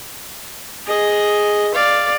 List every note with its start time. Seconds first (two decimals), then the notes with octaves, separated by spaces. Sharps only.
0.86 G#4 D#5
1.74 D5 F5